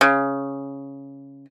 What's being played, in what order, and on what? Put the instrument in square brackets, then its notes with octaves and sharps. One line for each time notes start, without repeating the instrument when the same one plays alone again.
[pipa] C#3